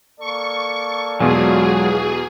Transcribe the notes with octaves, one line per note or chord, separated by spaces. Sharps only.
A#3 A4 D5 C#6
E2 B2 F#3 G#3 F4 G#4 G#5